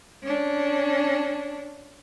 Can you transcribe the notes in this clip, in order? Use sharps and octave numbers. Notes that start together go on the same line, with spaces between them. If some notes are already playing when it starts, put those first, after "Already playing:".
C#4 D4